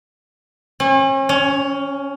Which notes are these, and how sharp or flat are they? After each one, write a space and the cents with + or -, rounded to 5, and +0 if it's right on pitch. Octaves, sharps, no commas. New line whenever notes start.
C#4 -40
C#4 +15